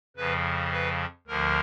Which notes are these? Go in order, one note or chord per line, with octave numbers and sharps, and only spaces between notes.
F2 C#3 F3 B4
B4
D2 D3 F3 A#4